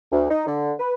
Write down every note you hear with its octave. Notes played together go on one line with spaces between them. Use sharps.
D2
D#4
D3
B4